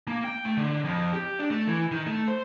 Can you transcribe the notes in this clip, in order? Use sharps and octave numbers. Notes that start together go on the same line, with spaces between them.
A#3
G5
A3
D3
F2
G4
D4
A3
E3
D#3
A3
C5